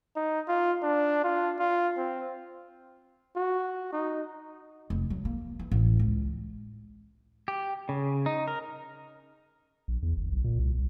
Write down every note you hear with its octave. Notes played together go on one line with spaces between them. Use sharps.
D#4
F4
D4
F4
F4
C4
F#4
D#4
F1
F#3
A#3
E3
A1
C#2
G4
C#3
D#4
A#4
A#1
E2
G1
B1
A#2
C2
C2